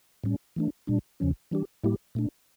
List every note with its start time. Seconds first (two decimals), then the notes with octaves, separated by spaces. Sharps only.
0.24 A2 G3 C#4
0.56 E3 A3 D4
0.87 A#2 G3 D4
1.20 E2 C#3 F3 C#4
1.51 E3 G3 D4 G4
1.84 A2 G3 A#3 E4 G4
2.15 A#2 A3 D4